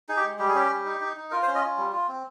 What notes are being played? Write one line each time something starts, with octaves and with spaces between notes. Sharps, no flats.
D#4 G#4
G4
G#3
G3 G4
G#4
C#4 G4
G3
D#4
D#4
D#4
F4 A#4
C5
C#4
D#5
F4
G3
F4
C4